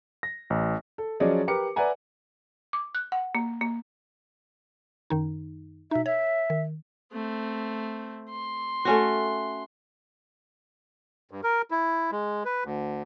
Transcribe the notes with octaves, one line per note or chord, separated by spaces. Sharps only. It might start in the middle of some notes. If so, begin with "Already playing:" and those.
A#6
A1
A4
F3 F#3 C#4 G#4 D5 D#5
G4 A#4 B4 D6 C#7
B4 D5 E5 F#5 G#5 A#5
D6
F#6
F#5
A#3
A#3
F#2 D#3 D#4
B2 D#4 E5
C#5 E5
D#3
A3 C4
C6
A3 C#4 F#4
G2
A#4
E4
G#3
B4
D2